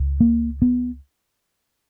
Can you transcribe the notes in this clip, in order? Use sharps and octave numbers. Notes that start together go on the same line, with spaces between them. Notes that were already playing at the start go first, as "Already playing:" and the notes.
Already playing: C#2
A#3
B3